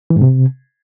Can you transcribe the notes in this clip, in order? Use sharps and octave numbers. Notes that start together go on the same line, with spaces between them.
E3
G#2
C3